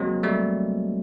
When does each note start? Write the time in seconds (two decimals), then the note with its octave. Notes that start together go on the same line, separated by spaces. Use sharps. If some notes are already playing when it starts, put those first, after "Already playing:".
Already playing: F#3 G#3 A#3 C4
0.23 G3 A3